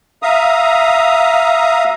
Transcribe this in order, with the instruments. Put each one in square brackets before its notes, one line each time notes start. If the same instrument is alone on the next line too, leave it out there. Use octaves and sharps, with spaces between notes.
[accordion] E5 F5 A#5 D#6